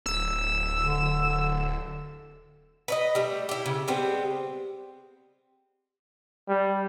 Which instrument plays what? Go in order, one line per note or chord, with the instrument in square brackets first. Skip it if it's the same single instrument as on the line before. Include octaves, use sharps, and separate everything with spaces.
[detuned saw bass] D1 [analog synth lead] E6
[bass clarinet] D3
[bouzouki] B4 D5 D#5
G3 A3
E4 G4
C#3
G3 G#3 B3 C4
[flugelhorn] G3